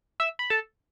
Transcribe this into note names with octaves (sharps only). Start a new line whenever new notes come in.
E5 E6
B5
A4 A5